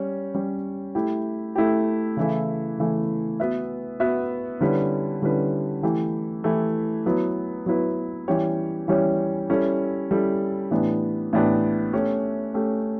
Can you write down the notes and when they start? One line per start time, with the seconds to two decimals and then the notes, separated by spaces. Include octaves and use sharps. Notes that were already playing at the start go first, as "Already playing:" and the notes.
Already playing: G3 C#4 G4 C#5
0.34 G3 C#4 G4 C#5
0.95 A3 E4 G4
1.56 A3 E4 G4
2.17 C#3 E3 A3 E4
2.78 C#3 E3 A3 E4
3.40 B3 F#4 B4 E5
4.00 B3 F#4 B4 E5
4.61 D3 G3 C#4 E4 B4
5.22 D3 G3 C#4 E4 B4
5.83 E3 A3 E4 G4
6.44 E3 A3 E4 G4
7.06 F#3 B3 E4 B4
7.66 F#3 B3 E4 B4
8.28 E3 G3 C#4 G4 C#5
8.88 E3 G3 C#4 G4 C#5
9.50 G3 C#4 E4 A4
10.11 G3 C#4 E4 A4
10.71 A2 E3 B3 D4 G4
11.33 A2 E3 B3 D4 G4
11.93 A3 C#4 G4
12.54 A3 C#4 G4